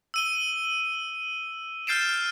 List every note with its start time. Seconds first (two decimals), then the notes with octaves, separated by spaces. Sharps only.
0.14 E6 D#7 G7
1.87 F6 G6 A6 C7 D7 E7